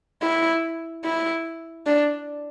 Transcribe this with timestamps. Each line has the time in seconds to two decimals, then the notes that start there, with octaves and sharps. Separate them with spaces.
0.22 E4
1.04 E4
1.86 D4